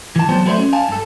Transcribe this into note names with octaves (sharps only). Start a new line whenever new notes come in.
E3 A5
F2 F#3 G3 B3 C5 A5
F#3 A3 B4 C5 D5 E5
C#4
F5 G#5 A5
G2 A4